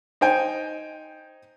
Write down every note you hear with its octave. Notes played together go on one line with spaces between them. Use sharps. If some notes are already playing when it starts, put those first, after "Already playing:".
D#4 C5 G5 G#5